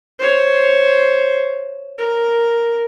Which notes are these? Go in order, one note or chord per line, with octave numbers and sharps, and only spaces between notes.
C5 C#5
A#4